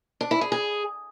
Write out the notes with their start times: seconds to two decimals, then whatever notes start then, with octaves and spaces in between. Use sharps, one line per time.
0.21 D4
0.31 E4
0.41 G#4
0.52 G#4